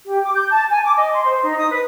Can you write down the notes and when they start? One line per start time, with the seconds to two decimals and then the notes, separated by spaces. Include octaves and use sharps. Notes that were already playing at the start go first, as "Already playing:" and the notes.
0.06 G4
0.23 D6
0.35 G6
0.51 A5
0.70 G#5
0.84 D6
0.96 D#5
1.13 C6
1.25 C5
1.43 D#4
1.58 D#6
1.71 B4